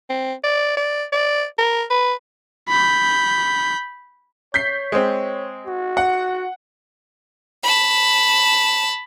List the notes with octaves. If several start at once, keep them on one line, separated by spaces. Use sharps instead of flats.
C4
D5
D5
D5
A#4
B4
B5 G6
C#5 G6 B6 C7
G#3 C4
F#4
F#5
A5 B5